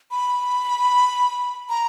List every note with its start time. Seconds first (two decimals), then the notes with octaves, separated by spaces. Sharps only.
0.11 B5
1.69 A#5